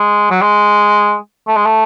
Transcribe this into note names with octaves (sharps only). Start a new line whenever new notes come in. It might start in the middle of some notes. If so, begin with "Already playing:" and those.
Already playing: G#3
F#3
G#3
A3
G#3
A3